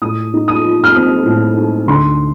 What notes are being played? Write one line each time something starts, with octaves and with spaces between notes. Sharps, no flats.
A2 D#6
D#4
D#6
F3
F6
C4 D#6
A2
D#4
D2 C6